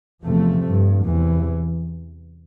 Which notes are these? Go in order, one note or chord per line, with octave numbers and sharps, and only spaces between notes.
E2 C3 F3 A3
G2
E2 C3 E3